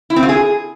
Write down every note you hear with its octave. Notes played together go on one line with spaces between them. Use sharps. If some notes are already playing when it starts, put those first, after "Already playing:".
E4
C4
F4
G#4